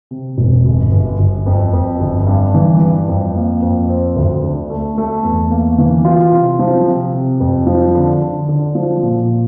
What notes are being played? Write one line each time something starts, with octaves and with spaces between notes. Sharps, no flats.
C3
E1
G1
G1
G1
F2
F2
G1
G2
E3
G2
F2
A#3
F2
C4
D2
D3
A3
A3
E2
A#3
E3
F4
C3
F3
C3
C3
F2
F3
D3
D3
D3
F3
A#2